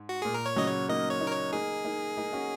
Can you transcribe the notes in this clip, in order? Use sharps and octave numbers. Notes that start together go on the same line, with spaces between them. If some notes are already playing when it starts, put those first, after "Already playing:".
Already playing: G#2
F#4
A#2 G#4
A#4
C#5
C#3 F#3 D#5
C#5
A#3 D#4 D#5
C#5
A#3 D#4
A#4
C#5
A#3 D#4 G#4
A#3 D#4
A#3 D#4
C#4 F#4